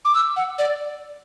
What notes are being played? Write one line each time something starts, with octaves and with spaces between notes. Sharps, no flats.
D6
E6
F#5
D5